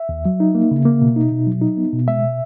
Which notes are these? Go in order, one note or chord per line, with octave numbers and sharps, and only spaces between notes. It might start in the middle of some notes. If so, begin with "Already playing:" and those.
Already playing: E5
D#2
F#3
D#4
A#3
C#3
A#3
B2
D#4
B2
F#3
D#4
B3
B2
G#3 E5
B2